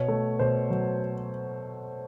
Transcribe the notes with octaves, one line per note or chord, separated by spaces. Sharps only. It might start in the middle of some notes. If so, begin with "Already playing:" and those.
Already playing: B2 C#5
A3
B2 C5
F#3